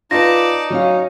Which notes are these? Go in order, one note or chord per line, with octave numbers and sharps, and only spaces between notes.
D#4 F4 B4 D5 A5 A#6
F#3 C#4 F5